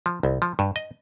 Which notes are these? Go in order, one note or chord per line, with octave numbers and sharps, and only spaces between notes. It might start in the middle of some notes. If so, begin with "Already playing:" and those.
F3
C2
F3
G2
D#5